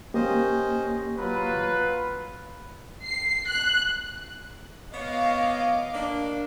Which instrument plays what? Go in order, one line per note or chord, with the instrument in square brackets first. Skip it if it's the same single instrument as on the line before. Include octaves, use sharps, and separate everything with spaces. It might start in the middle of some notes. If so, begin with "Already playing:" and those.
[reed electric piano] A#3 G4 [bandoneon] C#4 C5 D#5
[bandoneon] F#3 [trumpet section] F4 B4
[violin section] C7
F#6
[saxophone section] B3 C#5 [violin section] D#5 F5 D6
[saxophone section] A#3 D4